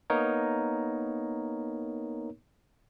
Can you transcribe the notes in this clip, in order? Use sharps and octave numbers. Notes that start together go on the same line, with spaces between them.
A#3 B3 D#4 A#4 C#5